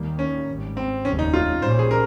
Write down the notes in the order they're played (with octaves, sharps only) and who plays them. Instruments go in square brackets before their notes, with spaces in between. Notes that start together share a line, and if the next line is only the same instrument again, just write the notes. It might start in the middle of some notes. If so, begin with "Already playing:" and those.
Already playing: [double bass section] D#2 D#3 G3 A#3
[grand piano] C#4
[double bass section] G#1 G#2 G3
[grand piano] C4
[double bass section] F1 D#2 C#3 G3 [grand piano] C#4
[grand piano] D#4
F4
[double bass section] A#1 A#2 G3 C#4 [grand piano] C5
[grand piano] G#4
A#4